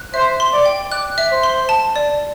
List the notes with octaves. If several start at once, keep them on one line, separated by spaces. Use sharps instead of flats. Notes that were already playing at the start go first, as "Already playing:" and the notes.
Already playing: F#6
C5 E5
C6
D5
G5
D5 F#6
E5
C5
C6
A5
D5